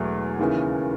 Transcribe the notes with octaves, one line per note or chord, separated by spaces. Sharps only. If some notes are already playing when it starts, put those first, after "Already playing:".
Already playing: E1 E2 F#3 A3
D#2 C#3 E3